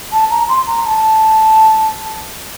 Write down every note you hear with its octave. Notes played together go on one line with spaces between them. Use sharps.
A5
A#5
C6
A#5
A5